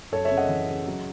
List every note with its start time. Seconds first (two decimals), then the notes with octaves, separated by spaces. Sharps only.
0.12 F#2 A4 C#5
0.25 C#5 E5
0.31 C#3
0.37 D#5 F#5
0.49 E3
0.69 C#3
0.87 F#3